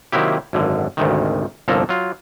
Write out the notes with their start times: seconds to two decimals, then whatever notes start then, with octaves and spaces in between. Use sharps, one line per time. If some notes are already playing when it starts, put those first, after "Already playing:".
0.12 C3 D#3 F#3 A#3 E4 G4
0.53 G#1 F#2 D3
0.97 G#1 D2 C3 D#3
1.68 G1 C2 F3 A#3 A4 A#5
1.89 F#3 F4